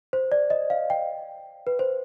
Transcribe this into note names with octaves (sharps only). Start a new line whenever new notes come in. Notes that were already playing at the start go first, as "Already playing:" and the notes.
C5
D5
D#5
F5
G5
B4
C5